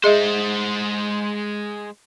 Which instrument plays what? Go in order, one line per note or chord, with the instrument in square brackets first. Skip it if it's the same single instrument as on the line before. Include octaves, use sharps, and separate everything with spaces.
[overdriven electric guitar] G#3 C5 [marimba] G#4 D#5 E5